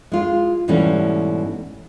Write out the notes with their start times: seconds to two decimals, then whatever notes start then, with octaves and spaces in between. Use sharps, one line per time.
0.12 G#3 F4
0.68 G#2 B2 E3 G3 A3 C#4